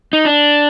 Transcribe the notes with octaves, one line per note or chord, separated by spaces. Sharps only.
D#4
D4